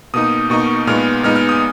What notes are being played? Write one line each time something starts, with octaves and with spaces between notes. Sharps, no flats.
B2 A#3 D#4 D#6
B2 A#3 D#4 C#6
A#2 G#3 B3 D#4 F6
A#2 G#3 B3 D#4 F6
F6
D#6